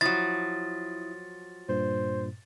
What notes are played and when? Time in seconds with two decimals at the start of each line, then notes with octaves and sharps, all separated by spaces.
0.01 F3 F#3 E4 D#6 A6
1.69 G2 A#2 C5